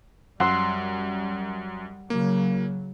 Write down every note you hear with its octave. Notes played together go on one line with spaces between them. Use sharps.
F#2 G3 F#5 C6 E6
C#3 F#3 A#3